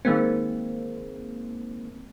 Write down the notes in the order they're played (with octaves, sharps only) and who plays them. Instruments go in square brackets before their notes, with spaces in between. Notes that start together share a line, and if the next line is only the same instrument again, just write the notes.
[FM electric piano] D#3 G#3 A#3 C4